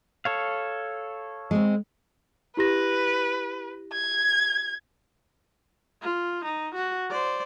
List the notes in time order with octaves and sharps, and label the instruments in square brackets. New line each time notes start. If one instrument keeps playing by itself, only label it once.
[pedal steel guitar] A4 C#5 F5
[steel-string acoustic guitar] G#3 C4
[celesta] E4 G4 A#6 [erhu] B4
[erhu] G#6
[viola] F4
D#4
F#4
C5 D5